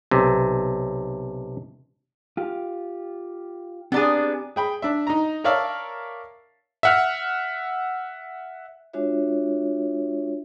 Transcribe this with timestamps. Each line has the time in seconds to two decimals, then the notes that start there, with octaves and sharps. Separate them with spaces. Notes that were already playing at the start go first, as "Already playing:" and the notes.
0.11 B1 C3
2.37 F4 G4
3.92 B3 C4 D4 G4 G#4 A#5
4.56 G#4 G5 B5
4.82 D4 E5
5.07 D#4 A#5
5.44 A#4 C#5 D5 E5 F5 A5
6.83 E5 F#5 F6
8.93 G#3 D4 F4 F#4 C#5 E5